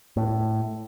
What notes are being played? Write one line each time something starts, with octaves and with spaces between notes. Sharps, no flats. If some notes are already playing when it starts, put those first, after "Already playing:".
A2